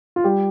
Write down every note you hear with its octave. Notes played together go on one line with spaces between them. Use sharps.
F4
G3 G4